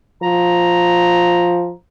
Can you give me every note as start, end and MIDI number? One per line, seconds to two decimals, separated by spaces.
0.23 1.72 53
0.23 1.75 82